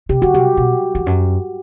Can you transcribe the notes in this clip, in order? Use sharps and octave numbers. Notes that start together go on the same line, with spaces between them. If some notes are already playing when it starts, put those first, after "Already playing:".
C3 G4
D3 F#4
C3 G4
B2
E2
F#2